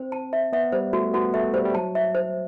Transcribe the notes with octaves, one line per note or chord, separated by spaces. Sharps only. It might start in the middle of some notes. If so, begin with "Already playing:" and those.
Already playing: C4 C5
A5
E5
B3 E5
G3 C5
A3 F#4
B3 F#4
A3 E5
G3 C5
G3
F#3 A5
E5
C5